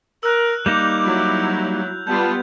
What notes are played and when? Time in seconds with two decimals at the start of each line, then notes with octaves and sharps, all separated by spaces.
0.23 A#4 E6 F#6
0.66 G3 A#3 D#4 D6 G6 F7
1.03 F#3 E4
2.07 G3 B3 F4 A5 G6